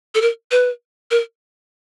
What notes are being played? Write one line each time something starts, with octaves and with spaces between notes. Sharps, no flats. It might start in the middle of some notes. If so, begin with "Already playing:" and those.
A4
A#4
B4
A#4